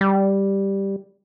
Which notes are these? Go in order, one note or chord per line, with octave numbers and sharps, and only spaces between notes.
G3